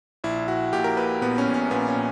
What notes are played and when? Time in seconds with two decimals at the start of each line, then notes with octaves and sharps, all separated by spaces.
0.24 A#1 E4
0.48 A#1 F#4
0.73 A#2 G4
0.84 A#4
0.97 A#2 B4
1.22 A#1 B3
1.38 C#4
1.47 A#1
1.54 C#4
1.71 A#2 B3
1.88 C#4
1.96 A#2